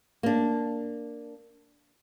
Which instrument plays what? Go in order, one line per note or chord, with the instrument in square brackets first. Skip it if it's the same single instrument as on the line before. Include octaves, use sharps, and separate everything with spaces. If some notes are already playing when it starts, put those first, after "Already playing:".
[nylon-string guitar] A#3 D4